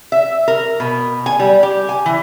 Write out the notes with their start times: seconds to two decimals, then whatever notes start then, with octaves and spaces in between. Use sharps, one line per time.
0.12 E5
0.48 A#4
0.80 B2
1.26 G#5
1.40 G3
1.63 G4
1.89 G#5
2.06 E3